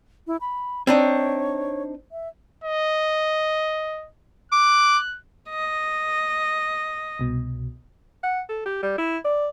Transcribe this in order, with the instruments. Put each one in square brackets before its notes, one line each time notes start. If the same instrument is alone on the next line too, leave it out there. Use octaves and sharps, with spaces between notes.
[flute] E4
B5
[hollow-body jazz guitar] C4 D4 D#4 [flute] C#5
[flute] E5
[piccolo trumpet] D#5
[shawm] D6 [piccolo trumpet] F#6
[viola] D#5
[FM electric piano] C2 B2
[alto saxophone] F#5
A4
G4
G3
E4
D5